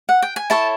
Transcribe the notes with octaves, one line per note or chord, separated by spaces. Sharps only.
F#5
G5
G#5
E4 A4 C#5 A5